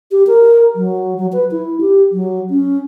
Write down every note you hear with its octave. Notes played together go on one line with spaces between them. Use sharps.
G4
A#4
F#3
F#3
B4
E4
G4
F#3
C#4